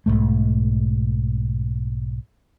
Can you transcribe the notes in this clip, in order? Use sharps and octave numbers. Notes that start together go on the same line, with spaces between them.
B1 E2 G#2 A3